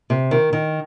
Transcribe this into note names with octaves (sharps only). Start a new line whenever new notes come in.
C3
D#3
D#3